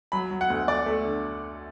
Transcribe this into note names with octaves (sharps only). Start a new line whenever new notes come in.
F#3 B5
F#3
F#5
D2
D2 D5
A3
D3